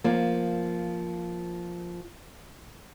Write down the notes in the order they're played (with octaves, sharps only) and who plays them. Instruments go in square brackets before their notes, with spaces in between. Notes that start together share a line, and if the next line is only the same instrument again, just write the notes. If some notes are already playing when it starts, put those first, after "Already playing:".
[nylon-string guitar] F3 A#3